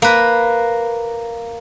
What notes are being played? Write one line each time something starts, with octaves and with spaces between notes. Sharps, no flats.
A#3 B4